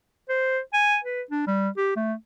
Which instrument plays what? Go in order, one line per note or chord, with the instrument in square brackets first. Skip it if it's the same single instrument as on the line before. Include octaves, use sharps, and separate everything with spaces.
[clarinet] C5
G#5
B4
D4
G3
G4
A3